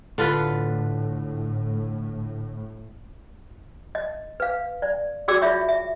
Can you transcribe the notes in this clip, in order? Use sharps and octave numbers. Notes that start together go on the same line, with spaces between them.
A2 D3 F4 B4
D#5
B4 F5
D5
F#4 G#4 D5 D6 E6
F4 C#5 E5 C#6
E5